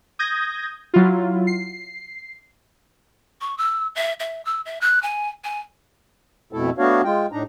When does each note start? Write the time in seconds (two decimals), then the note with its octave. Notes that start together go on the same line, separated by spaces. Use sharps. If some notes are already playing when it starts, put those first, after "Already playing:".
0.19 D#6 G6 G#6 A#6
0.94 F#3 E4 F4
1.47 C7
3.41 C#6
3.58 E6
3.95 E5
4.20 E5
4.45 E6
4.66 E5
4.81 F#6
5.03 G#5
5.44 G#5
6.53 F2 B2 A3 E4 A4
6.78 A3 B3 D4 F#4 C#5 F5
7.04 G#3 F4 G5
7.32 A2 D4 D#4 A#5